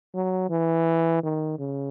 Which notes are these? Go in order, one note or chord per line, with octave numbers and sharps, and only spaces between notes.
F#3
E3
D#3
C#3